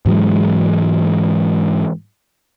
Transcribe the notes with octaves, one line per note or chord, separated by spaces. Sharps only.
G#2 E3 F#3 G#3